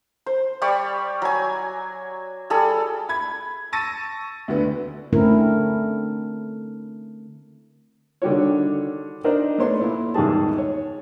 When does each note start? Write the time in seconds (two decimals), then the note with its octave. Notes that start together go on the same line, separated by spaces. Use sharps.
0.26 C5
0.62 G3 G4 D5 C#6
1.22 F#3 G#5
2.50 G3 G#4 A4
3.09 B5 G#6
3.72 A5 C#6 E6 A6 A#6 D#7
4.48 D2 D3 B3
5.13 D3 A3 C4 C#4 E4 A#4
8.22 D3 D#3 G3 D4 F#4 C#5
9.24 D4 D#4 A#4 C5 D5 D#5
9.58 A3 B3 D4 C#5 C6
9.81 A#2 E4
10.14 E2 G#2 D#3 G3 G#4 A5
10.58 C#5